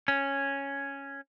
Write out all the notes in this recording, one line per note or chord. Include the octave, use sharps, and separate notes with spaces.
C#4